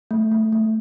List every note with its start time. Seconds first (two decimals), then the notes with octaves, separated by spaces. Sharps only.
0.11 A3
0.32 A3
0.53 A3